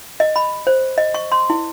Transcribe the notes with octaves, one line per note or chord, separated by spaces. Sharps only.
D#5
B5
C5
D#5
C#6
C6
E4